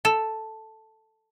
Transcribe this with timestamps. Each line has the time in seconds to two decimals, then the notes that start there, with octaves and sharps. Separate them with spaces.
0.05 A4